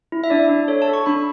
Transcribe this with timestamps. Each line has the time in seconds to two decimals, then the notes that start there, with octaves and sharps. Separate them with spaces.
0.12 E4
0.24 E5
0.30 D4 D5
0.49 D4
0.68 A4 C#5
0.82 A5
0.88 A4
0.93 C#6
1.06 D4 B5